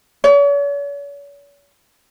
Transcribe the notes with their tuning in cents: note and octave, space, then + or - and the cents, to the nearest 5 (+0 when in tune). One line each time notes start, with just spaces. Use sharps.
C#5 +45